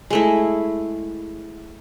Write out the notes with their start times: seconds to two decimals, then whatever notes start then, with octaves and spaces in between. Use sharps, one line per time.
0.10 G#3 A3 E4